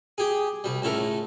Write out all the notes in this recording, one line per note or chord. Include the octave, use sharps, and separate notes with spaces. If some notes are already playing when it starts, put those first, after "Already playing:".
G4 G#4
C2 G3
C#2 A2 A4 A#4